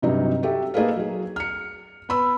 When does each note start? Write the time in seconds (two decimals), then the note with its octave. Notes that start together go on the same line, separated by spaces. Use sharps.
0.02 G2 C3 F#3 D#4
0.43 F#4 G4 A4 E5
0.74 A#3 D#4 G#4 A4 B4 F5
0.96 F#3 G#4
1.36 F6 C#7
2.09 B3 B5 E6